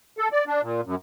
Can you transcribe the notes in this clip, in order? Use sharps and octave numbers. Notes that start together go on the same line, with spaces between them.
A4
D5
D4
A#2
F#2